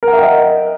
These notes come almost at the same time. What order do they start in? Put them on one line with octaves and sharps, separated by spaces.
A#4 F#5 E5 G5 D#5